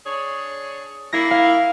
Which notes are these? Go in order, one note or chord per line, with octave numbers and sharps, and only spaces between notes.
D4 G#4 C#5
A#3 D4 E4 A#6 C7
F5